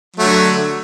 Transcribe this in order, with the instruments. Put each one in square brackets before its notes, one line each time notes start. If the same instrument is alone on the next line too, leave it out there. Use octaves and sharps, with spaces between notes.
[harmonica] F#3
A3
D3